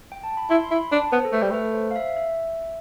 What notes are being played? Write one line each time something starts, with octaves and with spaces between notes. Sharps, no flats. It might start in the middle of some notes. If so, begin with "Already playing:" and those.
G5
A5
B5
E4 C6
C6
E4 B5
D4 A5
B3 C5
A4
A3 B4
G3
A3 B4
C5
F5
E5
E5